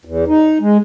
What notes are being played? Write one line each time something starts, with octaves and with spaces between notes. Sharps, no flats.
E2
D#4
G#3